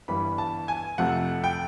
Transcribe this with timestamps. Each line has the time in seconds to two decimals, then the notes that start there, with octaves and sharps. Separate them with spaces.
0.08 G1 G2 E3 G3 B3 B5
0.38 A5
0.68 G#5
0.98 F2 C3 F3 A3 F#5
1.44 G5